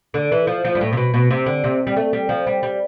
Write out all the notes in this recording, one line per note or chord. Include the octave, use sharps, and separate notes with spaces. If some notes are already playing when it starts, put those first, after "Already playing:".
D3
E3
F3
F3
G2
A2
C3
B2
B2
C3
D3
C3
G3
A3
G3
F3
G3
G3